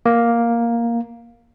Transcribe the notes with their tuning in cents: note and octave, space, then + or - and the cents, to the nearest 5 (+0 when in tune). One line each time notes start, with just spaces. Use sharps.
A#3 +5